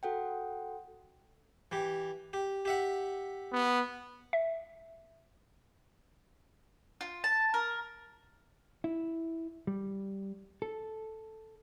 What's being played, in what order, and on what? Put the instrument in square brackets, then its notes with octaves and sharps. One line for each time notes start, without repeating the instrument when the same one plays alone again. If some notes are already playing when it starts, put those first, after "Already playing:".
[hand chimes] F#4 A4 F#5 G5
[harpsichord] E3 G4
G4
G4 E5 F#5
[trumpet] B3
[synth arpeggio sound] E5
[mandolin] F4
A5
A#4
[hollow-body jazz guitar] E4
G3
A4